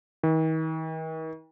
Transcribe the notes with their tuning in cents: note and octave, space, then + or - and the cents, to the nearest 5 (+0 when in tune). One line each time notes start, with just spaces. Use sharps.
D#3 +45